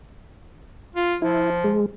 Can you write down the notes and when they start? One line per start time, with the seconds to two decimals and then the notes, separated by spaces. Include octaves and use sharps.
0.96 F4
1.22 F3 E4
1.64 G#3